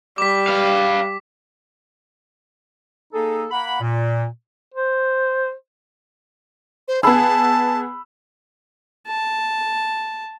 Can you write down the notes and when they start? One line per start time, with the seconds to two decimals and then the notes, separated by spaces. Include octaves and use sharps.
0.18 G3 D6 B6
0.47 B4 F5
3.13 A#3 D#4 G#4 A4
3.52 A#3 F#5 B5
3.81 A#2
4.74 C5
6.88 C5
7.03 B3 G#4 A5 B5 E6
9.07 A5